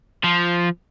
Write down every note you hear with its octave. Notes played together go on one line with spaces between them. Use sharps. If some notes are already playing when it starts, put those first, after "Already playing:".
F3